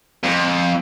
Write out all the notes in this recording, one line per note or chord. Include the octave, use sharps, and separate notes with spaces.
F2